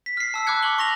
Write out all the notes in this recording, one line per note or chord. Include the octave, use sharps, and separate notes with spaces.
B6
F6 C7
A5 E6 F6
B5 D6 F6 F#6 G#6 C#7
C#6 F#7 G7
C#6 A#6 F7 F#7